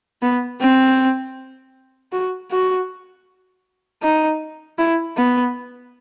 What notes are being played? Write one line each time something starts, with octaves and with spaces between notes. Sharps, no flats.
B3
C4
F#4
F#4
D#4
E4
B3